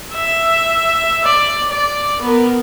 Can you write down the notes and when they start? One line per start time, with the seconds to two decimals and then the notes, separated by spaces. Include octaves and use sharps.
0.13 E5
1.24 D5
1.71 D5
2.22 B3 A#4